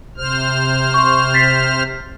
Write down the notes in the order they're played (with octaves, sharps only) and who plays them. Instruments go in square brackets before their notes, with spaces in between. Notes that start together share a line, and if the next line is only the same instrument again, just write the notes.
[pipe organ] C3 C5 F6
[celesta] C6 C#6
A6 B6 C7